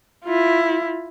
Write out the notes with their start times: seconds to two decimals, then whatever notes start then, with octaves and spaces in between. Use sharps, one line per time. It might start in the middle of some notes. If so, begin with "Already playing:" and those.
0.25 E4 F4